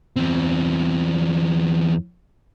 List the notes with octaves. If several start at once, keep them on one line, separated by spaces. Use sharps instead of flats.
E2 C4